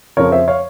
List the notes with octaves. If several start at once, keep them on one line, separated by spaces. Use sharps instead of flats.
F2 C#3 F3 A#4 C#5
C5 E5
C#5 F5